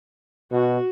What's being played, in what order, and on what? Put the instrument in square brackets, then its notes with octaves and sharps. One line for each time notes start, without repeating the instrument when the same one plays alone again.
[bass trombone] B2 [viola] F#4